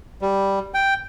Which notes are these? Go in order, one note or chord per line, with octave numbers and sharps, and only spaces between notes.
G3
G5